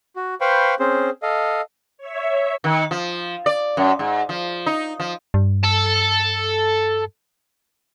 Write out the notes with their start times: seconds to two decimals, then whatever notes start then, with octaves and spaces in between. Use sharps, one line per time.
0.16 F#4
0.41 B4 C5 F5 G5 B5 C#6
0.79 C4 C#4 G#4 C5
1.23 A4 D#5 F5
1.98 C#5 E5
2.64 D#3
2.91 F3
3.46 D5
3.77 F#2
3.99 G#2
4.29 F3
4.66 D#4
5.00 F3
5.34 G2
5.64 A4 A5